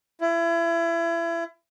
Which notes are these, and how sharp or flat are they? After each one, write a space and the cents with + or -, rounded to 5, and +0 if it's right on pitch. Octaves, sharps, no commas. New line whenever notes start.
E4 +30